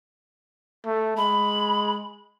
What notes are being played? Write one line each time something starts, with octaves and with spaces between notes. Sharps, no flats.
A3
G#3 B5